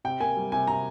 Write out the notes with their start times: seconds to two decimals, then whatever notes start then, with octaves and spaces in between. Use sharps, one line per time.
0.04 C3 G5
0.20 A#3 G#5
0.37 G3
0.52 C3 G#5
0.67 C3 A#5